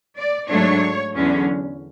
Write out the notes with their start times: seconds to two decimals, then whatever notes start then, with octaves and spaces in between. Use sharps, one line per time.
0.17 D5
0.49 G#2 F#3 A3 D4 C#5
1.15 E2 D3 F#3 C#4